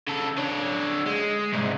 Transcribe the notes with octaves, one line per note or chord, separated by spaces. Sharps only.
C#3 A4
D3 C#5
G#3
C2 G#2